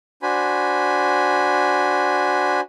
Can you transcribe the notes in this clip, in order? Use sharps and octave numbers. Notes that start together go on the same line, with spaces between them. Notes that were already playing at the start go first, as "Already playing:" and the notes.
D4 F#4 C5 G#5 B5